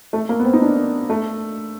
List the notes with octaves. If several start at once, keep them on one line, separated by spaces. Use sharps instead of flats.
A3
A#3
B3
C4
D#4
D4
A3